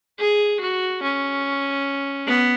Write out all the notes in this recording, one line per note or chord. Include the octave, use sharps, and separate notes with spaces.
G#4
F#4
C#4
B3